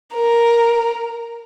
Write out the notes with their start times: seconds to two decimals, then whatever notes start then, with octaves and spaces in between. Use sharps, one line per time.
0.15 A#4